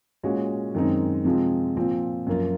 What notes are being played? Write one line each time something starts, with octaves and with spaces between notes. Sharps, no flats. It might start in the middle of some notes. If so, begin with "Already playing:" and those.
A#2 G#3 C#4 F#4
F#2 D#3 G#3 C4 D#4
C3 F3 G#3 C4
A#2 F3 C4
F#2 F3 A#3 F4